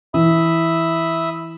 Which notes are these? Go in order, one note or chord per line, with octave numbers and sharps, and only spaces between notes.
E3 E5 B5 D#6